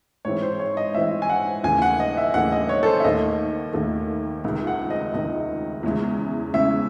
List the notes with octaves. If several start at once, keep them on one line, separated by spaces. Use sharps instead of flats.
G#2 E3 C4 C#5
C5
C#5
D#5
G#2 E3 C4 E5
G#5
F#5
D#2 C#3 E3 A3 G#5
F#5
D#5
E5
D#2 C#3 E3 A3 F#5
D#5
C#5
A4
C5
E5
D#2 D#3 A3 D#5
D#2 D#3 A3
C#2 C3 D#3
F#5
D#5
C#2 C3 D#3 D#5
E2 C#3 G#3 C#4 E4
E2 C#3 G#3 C#4 E4 E5